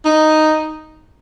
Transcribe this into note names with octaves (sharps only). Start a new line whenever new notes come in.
D#4